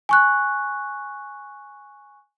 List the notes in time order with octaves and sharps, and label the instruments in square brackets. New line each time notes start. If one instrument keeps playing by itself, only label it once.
[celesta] G#5 C#6 F#6